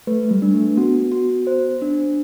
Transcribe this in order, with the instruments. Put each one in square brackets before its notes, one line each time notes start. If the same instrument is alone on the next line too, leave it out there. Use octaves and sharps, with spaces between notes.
[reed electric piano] A3 [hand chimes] B4
[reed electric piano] G3
[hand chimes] D4
[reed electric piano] A3
[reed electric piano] B3 [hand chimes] F#4
[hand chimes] F#4
C5
D4